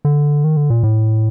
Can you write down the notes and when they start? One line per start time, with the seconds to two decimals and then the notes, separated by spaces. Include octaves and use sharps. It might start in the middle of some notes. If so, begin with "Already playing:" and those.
0.05 D3
0.44 D#3
0.57 D3
0.70 A#2
0.83 A2